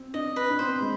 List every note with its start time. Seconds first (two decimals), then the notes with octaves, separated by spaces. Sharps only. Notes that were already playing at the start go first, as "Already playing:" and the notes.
Already playing: C4
0.14 D4 D#5
0.36 B4
0.50 D4
0.59 C4 C5
0.81 G#3